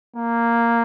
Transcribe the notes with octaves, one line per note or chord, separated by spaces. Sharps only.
A#3